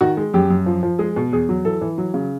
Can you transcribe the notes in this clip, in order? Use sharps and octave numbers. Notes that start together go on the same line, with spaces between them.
D#3 F#4
G#3
F#2 G4
F#2
F3
F3
G#3 G#4
B2
E2 G#4
F#3
E3 A4
E3
F#3
C#3